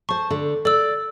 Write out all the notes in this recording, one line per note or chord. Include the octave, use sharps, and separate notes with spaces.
C5 A5 C#6
D3
A4 D5 E6